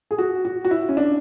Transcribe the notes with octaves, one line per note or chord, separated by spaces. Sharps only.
G#4
F#4
F#4
F#4
E4
C#4
D4